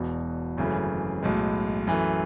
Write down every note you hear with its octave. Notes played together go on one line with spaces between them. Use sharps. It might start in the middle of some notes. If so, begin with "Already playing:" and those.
Already playing: E1 E2 B2
G#1 F#2 C#3 E3 A3
B1 A2 G#3
F#2 E3 A3